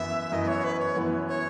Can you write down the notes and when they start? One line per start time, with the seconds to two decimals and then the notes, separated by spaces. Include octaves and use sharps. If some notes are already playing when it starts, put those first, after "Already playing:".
Already playing: F#2 E3 B3 E4 E5
0.32 F#2 E3 B3 E4 D#5
0.48 C#5
0.64 B4
0.80 C#5
0.96 F#2 E3 B3 E4
1.28 C#5